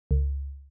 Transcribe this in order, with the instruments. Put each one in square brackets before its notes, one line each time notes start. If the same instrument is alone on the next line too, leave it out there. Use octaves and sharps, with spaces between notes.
[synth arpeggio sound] C#2